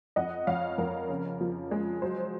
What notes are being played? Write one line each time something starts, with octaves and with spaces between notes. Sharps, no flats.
F2 D#5 F#5
F2 C#5 F5
F2 A#4
C#3
F3
G#3
F#3 C5